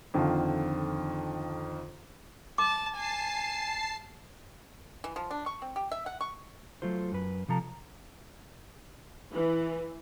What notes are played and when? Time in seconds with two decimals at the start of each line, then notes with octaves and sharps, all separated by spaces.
0.14 F2 D3 D#3 F4
2.58 A5 D6
2.96 G#5 A5 C7
5.04 E3
5.16 F3
5.31 D4
5.46 C#6
5.62 C4
5.76 G4
5.91 E5
6.06 F#5
6.21 C#6
6.82 F#3 A3 F4 C5
7.12 F#2 B4
7.48 C3 F3 A4 A#5
9.33 E3